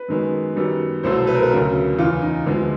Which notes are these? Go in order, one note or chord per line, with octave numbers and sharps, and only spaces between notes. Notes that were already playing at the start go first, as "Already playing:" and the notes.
Already playing: B4
F#2 D#3 G#3 B3
F#2 D#3 G3 B3
C2 B2 F#3 A3 C5
B4
A#4
B4
D2 C#3 F#3 A#4
E2 C#3 E3 F4
D#4
D2 D3 F3 G#3 B3 D4